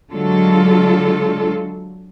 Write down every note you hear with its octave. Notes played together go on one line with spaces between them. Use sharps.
D3 F#3 G#3 F4 A4